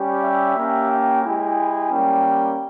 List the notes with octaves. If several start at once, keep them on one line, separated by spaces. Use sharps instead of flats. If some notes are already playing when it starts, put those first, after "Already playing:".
Already playing: G3 C#4 G4
E5
A#3 C#4 G4
G5
G#3 E4 G4 G#5
G3 A#3 C#4 G5